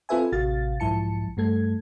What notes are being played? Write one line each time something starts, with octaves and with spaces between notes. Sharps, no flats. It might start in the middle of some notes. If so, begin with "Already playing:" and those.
C4 F4 A4 B4 E5 G#5
A1 C3 F#4 F5 A6
B1 G#2 F3 E4 A5 C#7
G2 A3 A4 G#6